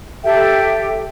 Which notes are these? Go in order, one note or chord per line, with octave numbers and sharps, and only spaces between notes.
G4 A4 E5 G5